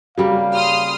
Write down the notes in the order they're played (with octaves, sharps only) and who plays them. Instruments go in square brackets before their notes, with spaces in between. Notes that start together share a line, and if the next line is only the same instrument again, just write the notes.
[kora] C#3 G3 A#3 [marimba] F#4 [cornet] F5
[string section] C6 D#6 F6